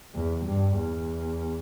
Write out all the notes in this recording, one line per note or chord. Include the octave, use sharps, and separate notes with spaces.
E2
G2
E2